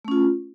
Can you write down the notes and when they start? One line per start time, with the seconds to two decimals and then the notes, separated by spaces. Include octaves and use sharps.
0.05 A3
0.08 C#4
0.11 F4